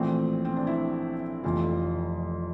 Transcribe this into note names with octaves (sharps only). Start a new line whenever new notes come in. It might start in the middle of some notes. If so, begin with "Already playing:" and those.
Already playing: A#1 A2 E3 C4
C4
D4
E4
F1 F2 E3 F4